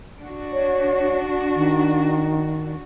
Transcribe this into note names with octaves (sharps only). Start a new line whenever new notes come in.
D4 F#4
C#5
D#3